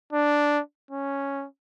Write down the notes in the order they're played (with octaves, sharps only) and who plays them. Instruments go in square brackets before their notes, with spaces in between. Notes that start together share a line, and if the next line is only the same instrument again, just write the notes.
[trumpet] D4
C#4